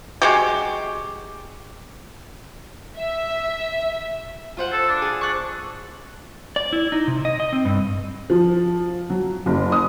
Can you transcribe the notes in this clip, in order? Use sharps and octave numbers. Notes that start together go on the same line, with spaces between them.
G#3 F#4 G4
E5
F4 C5 F#5
A4
D4
G#4
D4 C#6 F#6
D5
E4
D#4
C3
D#5
D#5
C4
G2
F3
F#3
F#1
D#6